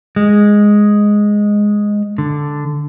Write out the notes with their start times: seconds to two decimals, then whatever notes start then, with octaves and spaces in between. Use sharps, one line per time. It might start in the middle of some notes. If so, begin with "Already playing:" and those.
0.16 G#3
2.18 D3